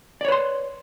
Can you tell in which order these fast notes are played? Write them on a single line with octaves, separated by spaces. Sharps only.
D5 C#5 B4 C6